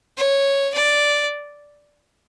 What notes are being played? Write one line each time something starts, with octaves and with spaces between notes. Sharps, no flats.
C#5
D5